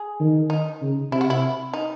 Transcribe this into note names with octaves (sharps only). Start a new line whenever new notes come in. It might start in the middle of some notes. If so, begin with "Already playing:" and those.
Already playing: G#4
D#3
D#4
C#3
C3 E4
F#4
E4
D#4